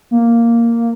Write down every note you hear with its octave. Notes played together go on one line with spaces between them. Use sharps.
A#3